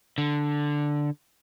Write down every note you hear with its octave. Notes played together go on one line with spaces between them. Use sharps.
D3